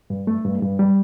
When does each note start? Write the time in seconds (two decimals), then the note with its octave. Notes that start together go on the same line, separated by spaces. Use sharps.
0.10 G2
0.27 A3
0.45 G2
0.62 G2
0.79 G3